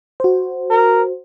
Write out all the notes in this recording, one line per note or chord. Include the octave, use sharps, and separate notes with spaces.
F#4 C5
A#4